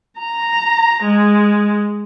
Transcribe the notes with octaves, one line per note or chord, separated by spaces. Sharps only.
A#5
G#3